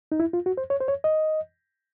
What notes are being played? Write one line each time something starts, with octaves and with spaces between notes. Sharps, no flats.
D#4
E4
F4
F#4
C5
C#5
C5
C#5
D#5